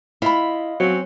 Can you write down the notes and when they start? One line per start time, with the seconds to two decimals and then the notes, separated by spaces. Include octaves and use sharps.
0.22 E4 F4 D#5 B5
0.80 F#3 C4 C#4